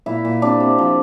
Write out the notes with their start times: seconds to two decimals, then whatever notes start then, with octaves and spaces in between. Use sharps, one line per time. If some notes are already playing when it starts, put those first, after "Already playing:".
0.06 A#2 E4 E5
0.25 A#2
0.42 C3 D4 D5
0.60 C3
0.78 F3